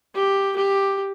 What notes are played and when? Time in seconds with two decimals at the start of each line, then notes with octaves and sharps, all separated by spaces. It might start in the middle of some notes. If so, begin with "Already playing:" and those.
0.15 G4
0.56 G4